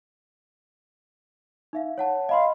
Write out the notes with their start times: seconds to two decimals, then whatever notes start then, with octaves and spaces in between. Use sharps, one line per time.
1.73 D#4 E5 F5
1.98 C#5 F#5 A5
2.29 D#5 F5 B5 C6